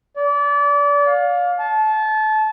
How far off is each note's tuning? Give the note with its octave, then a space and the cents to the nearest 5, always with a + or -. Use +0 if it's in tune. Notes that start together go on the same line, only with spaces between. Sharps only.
D5 -30
F5 +25
A5 -25